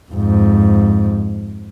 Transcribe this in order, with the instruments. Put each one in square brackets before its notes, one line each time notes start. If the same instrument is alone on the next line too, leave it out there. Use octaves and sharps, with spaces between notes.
[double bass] F2 G#2